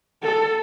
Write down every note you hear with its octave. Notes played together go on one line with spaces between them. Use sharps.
A4